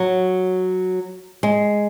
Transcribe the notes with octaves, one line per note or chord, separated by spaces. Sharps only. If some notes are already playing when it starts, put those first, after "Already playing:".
Already playing: F#3
G#3